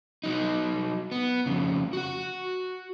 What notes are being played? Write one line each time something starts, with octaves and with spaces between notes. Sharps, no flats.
F#3 D#4
B3
F2 C#3
F#4 F#5